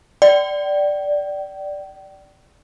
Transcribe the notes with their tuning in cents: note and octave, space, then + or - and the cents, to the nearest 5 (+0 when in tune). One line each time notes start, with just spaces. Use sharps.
D5 +0 G5 -35